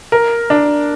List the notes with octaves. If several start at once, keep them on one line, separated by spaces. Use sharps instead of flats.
A#4
D4